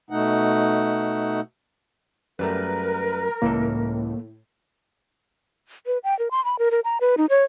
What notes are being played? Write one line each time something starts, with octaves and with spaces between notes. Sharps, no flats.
B2 A3 D#4 F#5
F#2 G3 A3 A#4 B4
C#2 A2 E3 A#3 A4
B4
G5
A#4
C6
B5
A#4
A#4
A#5
B4
D#4
C#5